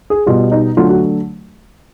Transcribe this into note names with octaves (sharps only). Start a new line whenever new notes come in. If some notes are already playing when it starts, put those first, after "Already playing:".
G#4
B2 G3 F4
D#4
D3 F#3 A3 F4
F#4